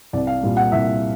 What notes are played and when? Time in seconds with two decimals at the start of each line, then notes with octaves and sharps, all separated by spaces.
0.13 C2 D5
0.27 F5
0.43 A#2 G3
0.57 F#5
0.72 C2 E5